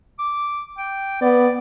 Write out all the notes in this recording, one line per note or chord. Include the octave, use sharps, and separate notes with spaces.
D6
G5
B3 D5